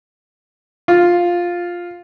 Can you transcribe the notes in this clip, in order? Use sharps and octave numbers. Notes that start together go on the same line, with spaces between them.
F4